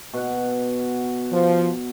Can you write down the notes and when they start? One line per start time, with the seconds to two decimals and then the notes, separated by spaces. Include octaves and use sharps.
0.14 B2 F#5
1.32 F3